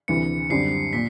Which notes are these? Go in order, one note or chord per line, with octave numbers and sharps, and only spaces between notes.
D2 C3 E3 C#7
F#2 D3 G3 C4 C7
A#2 B6